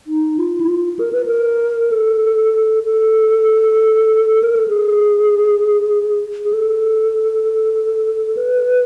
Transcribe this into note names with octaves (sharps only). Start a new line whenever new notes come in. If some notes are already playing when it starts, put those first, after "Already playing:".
D#4
F4
E4
F4
A#4
B4
A#4
A4
A4
A#4
A4
G#4
G#4
A4
B4